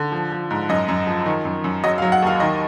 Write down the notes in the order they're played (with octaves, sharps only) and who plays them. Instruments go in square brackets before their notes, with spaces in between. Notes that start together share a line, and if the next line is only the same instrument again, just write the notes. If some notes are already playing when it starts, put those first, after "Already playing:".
Already playing: [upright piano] D3
F3
F3
G#2
F#2 D#5
F#2
F3
D#3
F#2
F#2
F#3 D#5
F5
F#3
F#5
D#2 F5
D#3 D#5